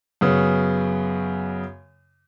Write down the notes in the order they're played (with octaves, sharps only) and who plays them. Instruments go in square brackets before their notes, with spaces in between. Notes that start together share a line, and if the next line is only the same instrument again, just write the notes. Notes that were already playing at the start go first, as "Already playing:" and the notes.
[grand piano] F#2 C#3 B3